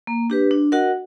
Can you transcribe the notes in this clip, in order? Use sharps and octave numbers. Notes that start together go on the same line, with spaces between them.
A#3
D4 G4 B4
D4
F#4 A#4 D#5 F#5